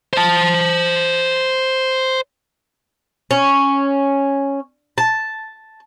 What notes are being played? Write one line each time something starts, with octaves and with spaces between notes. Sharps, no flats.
C5 A5
C#4
A5